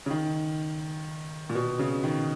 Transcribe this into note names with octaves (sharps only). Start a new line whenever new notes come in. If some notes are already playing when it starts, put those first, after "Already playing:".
C#3
D#3
A#2
B2
C#3
D#3